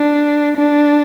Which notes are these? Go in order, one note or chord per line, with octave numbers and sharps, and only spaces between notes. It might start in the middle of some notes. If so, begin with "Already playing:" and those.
Already playing: D4
D4